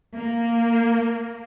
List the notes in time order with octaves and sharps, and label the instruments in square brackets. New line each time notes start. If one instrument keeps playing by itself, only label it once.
[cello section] A#3